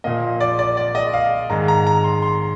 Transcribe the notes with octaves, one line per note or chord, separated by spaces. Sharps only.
A#2 F3 A#3 D#5
D5
D5
D5
D#5
F5
G#2 D#3 G#3 A#5
A#5
A#5
C6
C6